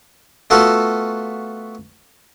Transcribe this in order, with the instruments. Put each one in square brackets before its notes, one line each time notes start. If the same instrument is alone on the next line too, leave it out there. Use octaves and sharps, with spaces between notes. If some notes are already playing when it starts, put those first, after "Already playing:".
[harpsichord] A3 B3 F4 F#4 A4